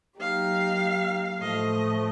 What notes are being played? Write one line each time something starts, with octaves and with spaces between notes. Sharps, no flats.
F#3 A#3 D#4 G4 F5
A2 F3 A3 D#5